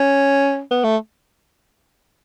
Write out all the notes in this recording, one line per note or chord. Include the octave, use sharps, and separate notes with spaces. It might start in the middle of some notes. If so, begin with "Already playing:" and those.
Already playing: C#4
B3
A3